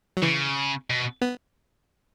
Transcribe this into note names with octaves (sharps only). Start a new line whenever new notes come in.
F#3
C#3 E3
B2
B3